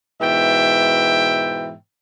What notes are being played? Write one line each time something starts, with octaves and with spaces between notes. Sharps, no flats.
G#2 B2 E3 E5 G5